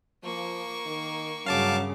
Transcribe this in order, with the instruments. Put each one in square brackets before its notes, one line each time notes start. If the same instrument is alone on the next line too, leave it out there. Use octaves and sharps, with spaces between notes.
[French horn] F3 [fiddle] A#3 C#6
[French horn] D#3
[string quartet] G2 C#3 [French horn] F#3 [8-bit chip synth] F5 A5 D6